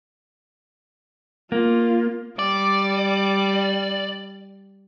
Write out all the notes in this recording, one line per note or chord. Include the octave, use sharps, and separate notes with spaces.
A#3 F4
G3 D5